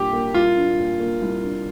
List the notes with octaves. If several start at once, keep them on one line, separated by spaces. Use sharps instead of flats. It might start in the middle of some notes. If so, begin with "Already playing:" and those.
Already playing: C2 A#2 A#3 D4 G4
A#3
C2 F4
D4
A#2
A#3
C2
D4